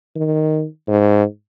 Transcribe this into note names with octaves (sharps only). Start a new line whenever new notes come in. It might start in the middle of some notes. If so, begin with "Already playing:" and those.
D#3
G#2